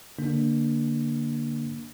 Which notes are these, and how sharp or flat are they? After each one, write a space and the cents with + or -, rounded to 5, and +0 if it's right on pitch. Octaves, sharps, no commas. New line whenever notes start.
D3 +0 A#3 +0 D4 +0